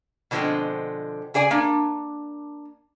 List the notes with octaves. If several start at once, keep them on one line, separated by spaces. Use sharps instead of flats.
B2 D3 F3 F#3 G#3 C4
C#3 G#4 D5 G#5
A#3 D4